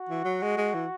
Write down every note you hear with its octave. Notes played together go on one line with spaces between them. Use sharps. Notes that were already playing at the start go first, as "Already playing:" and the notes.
Already playing: F#4
E3
F#3
G#3
G#3
E3